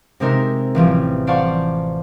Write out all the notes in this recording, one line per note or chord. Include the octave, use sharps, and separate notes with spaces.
C3 G#3 C4 D#4 A#4 E5
A1 E3 F3 G3
C5 D5 F5 F#5 A5 C#6